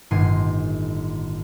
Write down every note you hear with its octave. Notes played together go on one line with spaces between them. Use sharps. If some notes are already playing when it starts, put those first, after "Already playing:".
G1 A2 D#3 G#5 C6 D#7